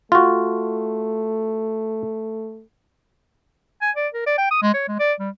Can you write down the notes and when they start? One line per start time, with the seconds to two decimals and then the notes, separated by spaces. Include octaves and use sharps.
0.12 A3 F4 F#4
3.82 G#5
3.96 D5
4.14 A#4
4.26 D5
4.38 G5
4.51 D#6
4.62 G#3
4.74 C#5
4.88 G#3
4.99 D5
5.20 G3